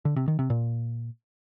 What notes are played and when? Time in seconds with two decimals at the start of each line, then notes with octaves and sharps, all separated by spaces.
0.05 D3
0.16 C3
0.28 D#3
0.39 C3
0.50 A#2